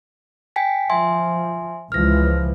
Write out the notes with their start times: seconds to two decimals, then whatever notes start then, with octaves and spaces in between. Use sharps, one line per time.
0.56 G5 G#5 B6
0.90 F3 E5 G#5 C6
1.92 C#2 E3 F3 F6 A#6